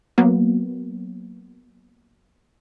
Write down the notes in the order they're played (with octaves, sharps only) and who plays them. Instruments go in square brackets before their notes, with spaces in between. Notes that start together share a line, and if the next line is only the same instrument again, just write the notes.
[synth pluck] F#3 A#3 B3